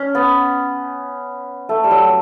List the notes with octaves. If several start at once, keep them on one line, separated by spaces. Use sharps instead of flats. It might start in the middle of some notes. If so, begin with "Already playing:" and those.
Already playing: C#4
B3
A3
G3
F#3